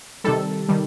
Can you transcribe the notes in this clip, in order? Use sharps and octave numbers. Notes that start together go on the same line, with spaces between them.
C3 D#3 G3 A4
D#3 G3